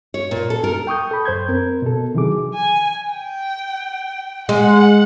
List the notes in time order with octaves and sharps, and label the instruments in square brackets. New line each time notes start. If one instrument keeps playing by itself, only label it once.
[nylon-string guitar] C#5
A#2
A4
A#4
[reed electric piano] G5 C#6 D#6 G6
A4 B5
F#2 C5 G6 G#6
C4 A#4
B2 A4
C3 D#3 E3 F#3 G#4 D6
[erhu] G#5
G5
[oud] G#3 [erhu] F#5